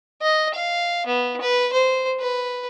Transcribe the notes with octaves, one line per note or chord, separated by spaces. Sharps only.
D#5
F5
B3
B4
C5
B4